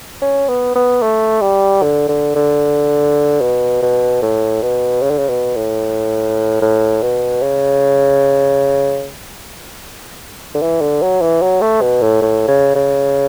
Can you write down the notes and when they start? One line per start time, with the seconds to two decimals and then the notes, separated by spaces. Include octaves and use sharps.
0.22 C#4
0.49 B3
0.75 B3
1.02 A3
1.41 G3
1.82 D3
2.08 D3
2.35 D3
3.41 B2
3.82 B2
4.22 A2
4.62 B2
5.02 C#3
5.10 D3
5.19 C#3
5.28 B2
5.56 A2
6.61 A2
7.02 B2
7.42 C#3
10.55 D3
10.62 E3
10.81 D3
11.02 F#3
11.21 E3
11.42 F#3
11.61 A3
11.81 B2
12.02 A2
12.22 A2
12.48 C#3
12.75 C#3